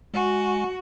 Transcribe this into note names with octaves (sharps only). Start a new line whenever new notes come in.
G#3 F#4 G#5